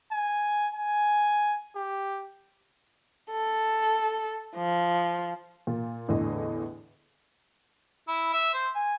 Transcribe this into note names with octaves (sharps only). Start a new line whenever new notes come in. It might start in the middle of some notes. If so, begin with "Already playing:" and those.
G#5
G#5
G4
A4
F3
A#2
E2 A2 D3 A4 D#5
E4
E5
C5
G#5